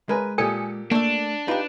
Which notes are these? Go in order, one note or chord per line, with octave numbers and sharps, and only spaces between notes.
G#3 A#4 B4 G#5
A#2 G4 A4 G#5 D#6 C#7
A3 A#3 D4 E5
D#4 F4 G4 B4